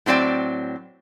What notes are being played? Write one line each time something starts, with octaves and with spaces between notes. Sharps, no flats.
A2 F#3 C4 D5 G5